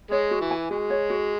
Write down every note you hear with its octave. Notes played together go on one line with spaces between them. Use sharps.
G#3 C#5
F#4
E3
G#5
G#3 F#4
C#5
F#4